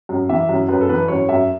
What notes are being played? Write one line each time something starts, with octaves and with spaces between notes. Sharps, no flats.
F#2
E3 E5
F#2
F#2 B4
A4
E3 B4
F#2 C#5
F#2 E5